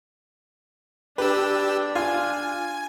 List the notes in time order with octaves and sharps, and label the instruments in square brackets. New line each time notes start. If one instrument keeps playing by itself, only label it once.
[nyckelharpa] D4 [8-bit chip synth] G4 E6 [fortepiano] B4
[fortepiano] F4 F6 [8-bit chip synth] G#5